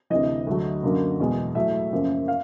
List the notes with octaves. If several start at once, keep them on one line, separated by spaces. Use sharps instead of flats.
D2 C3 E3 D#5
D2 D3 F#3 A3
F#2 D3 F#3 A#3
E2 B2 G#3
A2 F#3 A3 E5
F#2 C#3 F3 A#3
F5